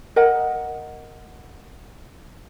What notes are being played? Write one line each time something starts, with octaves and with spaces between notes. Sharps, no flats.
A#4 D#5 F#5